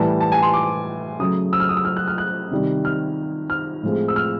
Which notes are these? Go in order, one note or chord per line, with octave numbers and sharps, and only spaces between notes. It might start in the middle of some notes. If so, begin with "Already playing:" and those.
Already playing: A2 E3 G3 A5
A5
G#5
C6
D6
C#3 F#3 A3 D#6
E6
F6
D#6
E6
F6
F#6
F6
F#6
C3 D#3 G3
F6
F6
A2 F3 G#3 C4
E6
F6